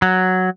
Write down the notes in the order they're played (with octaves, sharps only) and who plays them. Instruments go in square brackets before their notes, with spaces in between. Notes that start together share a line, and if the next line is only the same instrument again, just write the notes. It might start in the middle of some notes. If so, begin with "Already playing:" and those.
[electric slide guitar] F#3